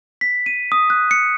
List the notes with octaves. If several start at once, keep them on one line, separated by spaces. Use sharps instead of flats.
B6
D#7
D#6
F#6
C#7